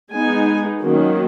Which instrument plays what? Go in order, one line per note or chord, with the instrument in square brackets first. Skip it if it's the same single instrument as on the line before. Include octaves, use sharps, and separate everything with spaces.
[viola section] G#3 B3 D#4 G#5
D#3 F#3 A#3 C#4